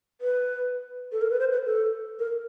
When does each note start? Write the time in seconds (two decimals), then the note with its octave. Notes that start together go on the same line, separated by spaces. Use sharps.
0.21 B4
1.12 A4
1.22 A#4
1.30 B4
1.40 C5
1.52 B4
1.66 A4
2.19 A#4